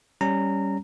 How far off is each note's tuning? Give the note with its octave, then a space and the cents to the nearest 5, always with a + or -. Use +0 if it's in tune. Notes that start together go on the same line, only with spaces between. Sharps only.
G3 +0 C#4 +0 A#5 -20